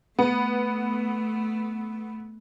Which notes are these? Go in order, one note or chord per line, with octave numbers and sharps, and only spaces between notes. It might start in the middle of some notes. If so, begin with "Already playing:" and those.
A3 B3